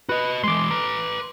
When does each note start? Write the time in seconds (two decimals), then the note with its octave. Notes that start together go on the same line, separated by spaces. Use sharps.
0.09 F#4 B4 D#5
0.44 E3 G#3 C6 D6
0.71 B4 A#5